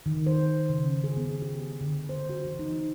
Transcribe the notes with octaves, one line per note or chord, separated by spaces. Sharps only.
D#3
C5
C#3
C#4
G#4
B3
G4
D3
C5
F#4
E3
D#4